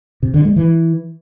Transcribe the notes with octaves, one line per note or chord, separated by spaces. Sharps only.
C3
D3
G#3
E3